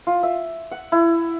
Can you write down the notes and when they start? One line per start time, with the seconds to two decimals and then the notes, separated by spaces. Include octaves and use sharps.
0.07 F4
0.23 E5
0.72 F#5
0.92 E4